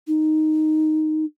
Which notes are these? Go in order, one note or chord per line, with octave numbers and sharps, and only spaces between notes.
D#4